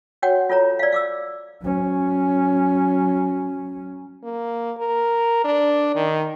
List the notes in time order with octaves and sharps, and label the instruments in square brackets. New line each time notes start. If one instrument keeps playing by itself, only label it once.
[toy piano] F#4 C#5 F#5 G5
F4 A4 C#5 A#5
D5 F5
F5 D6 E6
[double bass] F#3 C#4
[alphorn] A#3
A#4
D4
D#3